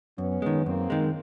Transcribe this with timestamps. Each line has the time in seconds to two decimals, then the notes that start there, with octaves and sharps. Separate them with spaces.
0.18 F#2 B3 C#4
0.42 D#3 G#3
0.66 F#2 A#3 C4
0.90 D#3 G#3